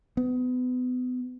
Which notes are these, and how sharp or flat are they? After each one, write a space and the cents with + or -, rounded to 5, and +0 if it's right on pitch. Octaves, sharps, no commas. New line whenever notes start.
B3 +30